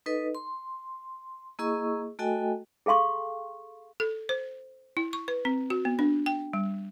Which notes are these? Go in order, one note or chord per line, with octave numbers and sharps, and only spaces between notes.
D#4 A4 B4 D#5
C6
A#3 E4 G#4 D#5 C#6 E6
A3 F#4 A4 D#5 G5 G#5
G#4 A4 F5 C6 C#6
A4
C5
E4
C#6
B4
C4
F#4
B3
D4
G5
G3